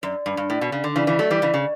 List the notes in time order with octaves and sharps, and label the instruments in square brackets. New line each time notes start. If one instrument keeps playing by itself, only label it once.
[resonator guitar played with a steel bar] F#2 [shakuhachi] D5
[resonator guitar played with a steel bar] G2
G2
A2
B2
C#3
D3
[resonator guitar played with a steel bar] C#3 E3 [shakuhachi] D5
[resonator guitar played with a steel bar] C#3 E3
F#3 A3
E3 G3
C#3 E3
C#3